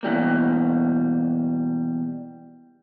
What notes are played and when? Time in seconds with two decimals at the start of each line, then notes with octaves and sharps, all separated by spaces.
0.03 B2 E3 G3 A#3